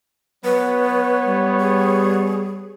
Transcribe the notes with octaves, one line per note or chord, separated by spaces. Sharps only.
F#3 B3 B4 C#5
G3
G#4